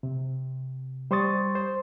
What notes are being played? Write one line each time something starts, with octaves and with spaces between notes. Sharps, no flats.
C3
G3 C5 C6 C#6 D#6 A6
C5